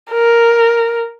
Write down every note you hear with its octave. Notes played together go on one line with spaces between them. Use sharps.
A#4